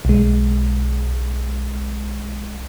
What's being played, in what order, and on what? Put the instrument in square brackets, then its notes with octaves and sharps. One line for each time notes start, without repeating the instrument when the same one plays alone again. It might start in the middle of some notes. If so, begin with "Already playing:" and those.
[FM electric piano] B1 G#3